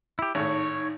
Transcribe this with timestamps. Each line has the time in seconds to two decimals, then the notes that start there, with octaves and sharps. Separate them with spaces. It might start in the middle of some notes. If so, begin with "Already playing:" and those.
0.19 E4 G4
0.35 G#1 A2 D#4 C#5